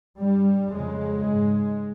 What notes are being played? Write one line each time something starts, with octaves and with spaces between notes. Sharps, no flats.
G2 G3
F2 C#3 G#3
G#2